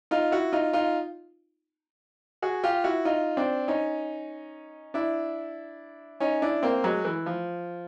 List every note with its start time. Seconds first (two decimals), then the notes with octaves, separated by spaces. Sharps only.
0.11 D#4 F4
0.32 E4 F#4
0.53 D#4 F4
0.73 D#4 F4
2.42 F#4 G#4
2.64 F4 G4
2.84 E4 F#4
3.05 D#4 F4
3.37 C4 D4
3.68 C#4 D#4
4.94 D4 E4
6.20 C#4 D#4
6.42 D4 E4
6.63 A#3 C4
6.84 F#3 G#3
7.05 E3
7.26 F3